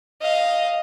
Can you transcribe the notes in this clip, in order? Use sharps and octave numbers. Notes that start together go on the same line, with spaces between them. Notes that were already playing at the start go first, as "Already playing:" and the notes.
D#5 F5